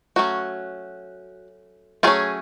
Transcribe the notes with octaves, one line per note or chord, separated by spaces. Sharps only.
F#3 A3 C#4 F#4
F#3 A3 C#4 F4 G#4